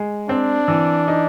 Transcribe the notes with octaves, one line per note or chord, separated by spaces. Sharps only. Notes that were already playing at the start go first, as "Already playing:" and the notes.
Already playing: G#3
C4 D4
E3
D#4